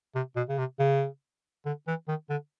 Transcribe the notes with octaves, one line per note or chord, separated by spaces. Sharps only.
C3
B2
C#3
C3
C#3
D3
E3
D#3
D3